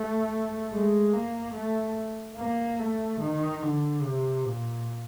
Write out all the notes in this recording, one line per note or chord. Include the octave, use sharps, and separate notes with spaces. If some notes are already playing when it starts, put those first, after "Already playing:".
Already playing: A3
G#3
A#3
A3
A#3
A3
D#3
D3
C3
A#2